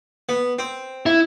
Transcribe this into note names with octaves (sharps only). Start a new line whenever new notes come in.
B3
C4
E4